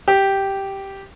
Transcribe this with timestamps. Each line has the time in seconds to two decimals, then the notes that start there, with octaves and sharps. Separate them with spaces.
0.08 G4